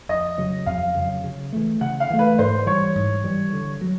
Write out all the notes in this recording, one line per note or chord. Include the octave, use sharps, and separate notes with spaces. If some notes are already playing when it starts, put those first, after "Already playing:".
F2 D#5
C#3 F#3
F2 F5
C#3 F#3
C#3
E3 A3
C#3 F#5
F5
E3 A3
B4
G#2 C5
E3 G3 C#5
G#2
E3 G3
D3
F#3